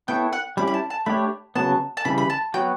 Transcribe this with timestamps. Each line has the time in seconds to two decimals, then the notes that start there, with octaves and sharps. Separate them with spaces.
0.08 B3 E4 A4 C#5 G5
0.33 F#5
0.57 G3 C#4 E4 G4 B5
0.67 B5
0.74 A5
0.90 A5
1.06 A3 D4 G4 C#5 B5
1.56 C#3 F#3 B3 A5
1.97 A5
2.05 C#3 E3 G3 B5
2.18 B5
2.30 A5
2.54 F#3 B3 F#4 C#5 G5